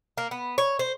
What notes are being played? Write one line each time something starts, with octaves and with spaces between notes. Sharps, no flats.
A#3
B3
C#5
C5